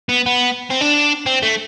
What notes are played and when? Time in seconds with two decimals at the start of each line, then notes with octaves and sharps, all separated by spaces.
0.09 B3
0.26 B3
0.71 C4
0.81 D4
1.26 C4
1.43 A3